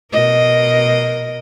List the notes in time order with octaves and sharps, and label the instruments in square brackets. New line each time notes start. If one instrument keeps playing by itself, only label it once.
[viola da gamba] B2 A#4 D#5